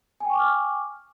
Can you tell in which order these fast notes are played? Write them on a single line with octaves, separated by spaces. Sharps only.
G#5 G5 C#6 D6 F6